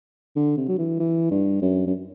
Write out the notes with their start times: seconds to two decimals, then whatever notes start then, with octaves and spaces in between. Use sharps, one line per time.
0.36 D3
0.57 C3
0.68 F#3
0.78 E3
0.99 E3
1.31 G2
1.62 F#2
1.87 F#2